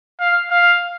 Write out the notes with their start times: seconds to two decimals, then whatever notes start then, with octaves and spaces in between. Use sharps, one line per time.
0.20 F5
0.51 F5